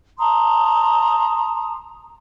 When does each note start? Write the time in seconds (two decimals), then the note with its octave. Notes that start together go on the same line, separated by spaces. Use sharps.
0.19 A5 A#5 C6 D#6